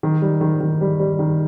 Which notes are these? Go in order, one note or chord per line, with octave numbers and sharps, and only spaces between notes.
D#3
G3
D#3
D#3
G3
G3
D#3